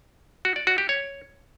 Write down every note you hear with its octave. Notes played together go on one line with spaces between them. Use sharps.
F#4
D5
F#4
G4
C#5